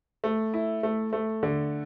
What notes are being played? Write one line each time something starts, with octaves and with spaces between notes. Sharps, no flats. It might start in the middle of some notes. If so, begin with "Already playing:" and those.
A3
E4
A3
A3
D3